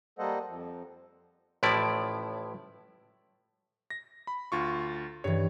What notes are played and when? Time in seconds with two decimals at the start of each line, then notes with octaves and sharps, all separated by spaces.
0.19 G3 A#3 A4 C5 D#5 F#5
0.49 F2 F3
1.63 A1 A2 F3 E4 D5
3.90 A#6
4.27 B5
4.52 D2 F4 C#6
5.24 G2 E3 C#5